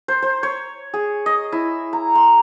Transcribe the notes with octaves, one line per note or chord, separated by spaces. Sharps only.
C5
C5
C#5
G#4
D#5
E4
A#5
C6